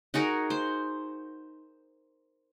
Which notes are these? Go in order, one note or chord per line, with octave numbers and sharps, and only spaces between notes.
D#4 F#4 G#4 A#4
C5